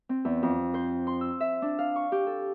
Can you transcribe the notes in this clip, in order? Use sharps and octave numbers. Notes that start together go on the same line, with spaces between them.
C4
E2
F2
C5
C6
E6
E5
D4
F5
C#6
G4
A4